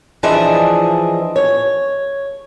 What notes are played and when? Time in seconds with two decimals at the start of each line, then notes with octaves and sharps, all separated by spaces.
0.23 E3 F3 D4 G#4 D#5 E5
1.36 C#5